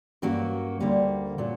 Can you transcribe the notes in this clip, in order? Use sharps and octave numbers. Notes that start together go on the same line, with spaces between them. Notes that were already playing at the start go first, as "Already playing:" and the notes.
G2 F#3 A#3 C#4
D2 D3 G3 A#3
A#2 F#3 C#4